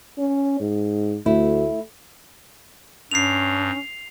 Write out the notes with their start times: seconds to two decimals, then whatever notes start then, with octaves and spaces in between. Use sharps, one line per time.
0.18 C#4
0.61 G#2
1.26 D2 A3 E4
3.11 G2 C#4 C7 F7